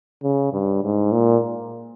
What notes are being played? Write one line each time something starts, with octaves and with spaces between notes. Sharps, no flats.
C#3
G2
G#2
A#2